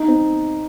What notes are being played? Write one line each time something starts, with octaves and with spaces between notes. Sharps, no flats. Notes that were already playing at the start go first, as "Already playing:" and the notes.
Already playing: D#4
C4